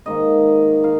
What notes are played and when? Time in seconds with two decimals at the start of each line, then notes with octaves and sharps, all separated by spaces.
0.06 G#2 D#3 A#3 D#5
0.83 D#3 F5